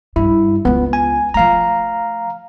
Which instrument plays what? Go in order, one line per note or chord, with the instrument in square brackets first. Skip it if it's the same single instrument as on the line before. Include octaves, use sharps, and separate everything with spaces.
[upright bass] G2 [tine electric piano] E4
[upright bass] C#2 F4 [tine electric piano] B3
[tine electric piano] G#5
[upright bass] F3 A3 [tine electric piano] F5 A#5